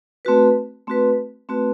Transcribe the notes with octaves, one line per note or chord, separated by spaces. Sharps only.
A3 C4 F#4 B4
A3 C4 F#4 B4
A3 C4 F#4 B4